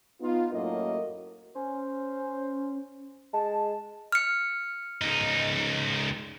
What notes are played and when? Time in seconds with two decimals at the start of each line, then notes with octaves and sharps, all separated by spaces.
0.21 B3 D#4 F4
0.53 F#2 A2 F#3 A#3 A#4 D#5
1.55 C#4 C5
3.33 G#3 A5
4.12 F6 C#7
5.02 C#2 D#4